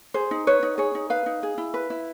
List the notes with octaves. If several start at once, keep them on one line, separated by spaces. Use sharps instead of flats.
G#4 C5
D#4
B4 C#5
D#4
G#4 C#5
D#4
B4 F5
D#4
G#4
E4
B4
E4